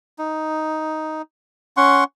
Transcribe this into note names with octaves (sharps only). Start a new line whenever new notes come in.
D#4
C#4 F#5 C6 C#6